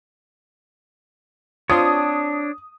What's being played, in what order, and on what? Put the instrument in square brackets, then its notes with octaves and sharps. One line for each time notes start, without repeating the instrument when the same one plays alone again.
[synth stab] C4 F4 [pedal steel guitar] D4 C#5 [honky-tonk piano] D#6